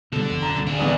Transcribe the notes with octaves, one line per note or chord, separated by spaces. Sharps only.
B2 D3 G3 A4
F#1 E2
F#2 A#2 A#5
C2 A#2
D1 D4 G#4
A#1 E2 G#3